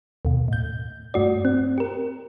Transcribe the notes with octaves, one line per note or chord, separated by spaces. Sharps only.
D#2 B2
A2 G6
G2 A3 F#4 D5
C4
G4 A#4